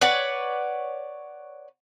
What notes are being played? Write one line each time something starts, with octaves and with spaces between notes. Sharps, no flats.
B4 C#5 D5 F#5